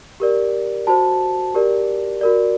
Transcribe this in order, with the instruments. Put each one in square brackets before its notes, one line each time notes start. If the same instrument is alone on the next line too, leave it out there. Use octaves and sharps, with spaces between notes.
[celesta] G4 A#4 D5
F#4 C5 A5
G4 A#4 D5
F#4 A#4 D5